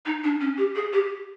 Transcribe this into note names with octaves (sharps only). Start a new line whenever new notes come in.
D#4
D4
C#4
G4
G#4
G4